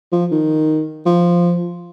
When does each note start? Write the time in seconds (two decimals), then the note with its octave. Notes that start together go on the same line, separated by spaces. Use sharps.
0.12 F3
0.32 D#3
1.06 F3